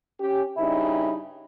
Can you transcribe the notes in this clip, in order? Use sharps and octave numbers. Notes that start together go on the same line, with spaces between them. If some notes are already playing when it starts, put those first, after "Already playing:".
C#4 G4
G2 C#3 D#4 E4